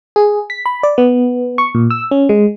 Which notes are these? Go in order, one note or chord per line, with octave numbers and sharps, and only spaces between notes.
G#4
B6
B5
D5
B3
C#6
A#2
E6
C#4
G#3